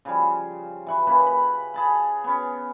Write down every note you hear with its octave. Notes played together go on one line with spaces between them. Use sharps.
C#3 F3 G3
E3 F#5 C#6
C#3 A#3 B4 C6
B5
G#4 A5 B5
B3 C#4